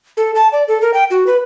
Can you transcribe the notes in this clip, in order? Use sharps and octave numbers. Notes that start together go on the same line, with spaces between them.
A4
A5
D5
A4
A#4
G5
F#4
B4